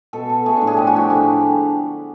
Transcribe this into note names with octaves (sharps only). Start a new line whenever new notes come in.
B2 A4
B2
A3 G#4
A2 D4
G#4
F3 G4
F#4
A2 G4
D3 G#4